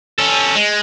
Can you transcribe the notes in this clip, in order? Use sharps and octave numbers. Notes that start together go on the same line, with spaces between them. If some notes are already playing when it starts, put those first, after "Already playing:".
C#4 A4
G#3